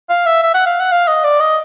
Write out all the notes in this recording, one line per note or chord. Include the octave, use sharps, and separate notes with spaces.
F5
E5
E5
F#5
F5
F#5
F5
D#5
D5
D#5